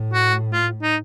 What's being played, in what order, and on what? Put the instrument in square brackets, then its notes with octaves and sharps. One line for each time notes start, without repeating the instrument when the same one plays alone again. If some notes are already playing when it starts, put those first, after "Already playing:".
Already playing: [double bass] A2
[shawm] F#4
F4
D#4